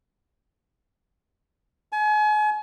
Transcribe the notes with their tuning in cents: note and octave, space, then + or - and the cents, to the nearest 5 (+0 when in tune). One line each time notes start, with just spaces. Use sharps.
G#5 +35